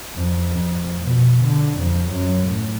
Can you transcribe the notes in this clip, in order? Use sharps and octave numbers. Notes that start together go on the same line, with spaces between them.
F2
F2
B2
D3
F2
F#2
A2